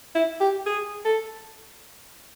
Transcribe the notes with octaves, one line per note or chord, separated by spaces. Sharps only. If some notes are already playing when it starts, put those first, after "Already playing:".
E4
G4
G#4
A4